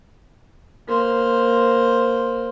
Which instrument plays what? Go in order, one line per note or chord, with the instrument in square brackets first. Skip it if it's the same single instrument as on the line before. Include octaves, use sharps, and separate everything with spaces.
[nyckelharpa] A#3 C5